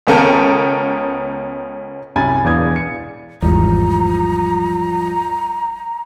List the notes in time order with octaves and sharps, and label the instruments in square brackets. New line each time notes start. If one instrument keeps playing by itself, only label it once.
[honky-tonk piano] C#2 B3 C#4 A4 A#4 G5
[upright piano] C2 F#2 G#5 B5 A6
E1 E2 D5 F5 D#6 G#6
C#7
[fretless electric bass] G#1 E2 [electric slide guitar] F3 G3 [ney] A#5